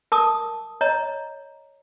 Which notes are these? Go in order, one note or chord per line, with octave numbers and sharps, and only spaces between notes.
A#4 A5 D6 D#6
C#5 D#5 A#5